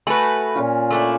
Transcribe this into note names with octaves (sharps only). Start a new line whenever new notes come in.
A3 F#4 B4 G#5
A#2 C#4 F4
A3 D4 E4